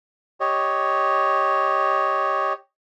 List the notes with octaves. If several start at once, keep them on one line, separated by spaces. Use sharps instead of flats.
G4 C#5 D#5